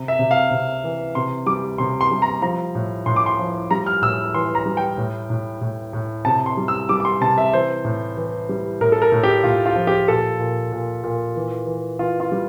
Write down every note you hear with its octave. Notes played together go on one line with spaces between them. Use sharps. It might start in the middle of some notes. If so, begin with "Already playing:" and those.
Already playing: C3
E5
C3
F5
C3
E3
C3 C6
G3 D6
C3 C6
C6
G3
A#5
F3 A#5
A2
A2 C6
D6
C6
F3
G3 A#5
F6
A2 E6
E3 C6
A#5
G3
G5
A2
A2
A2
A2
C3 A5
C6
G3
E6
G3 D6
D6
C6
C3 A5
E5
E3 C5
A2
E3
G3
A2 A#4
A4
A#4
A2
G4
A2 F4
F4
F3
G4
A#2 A4
A#2
A#2
A#2
E3
E3
E3 F4
F4
G3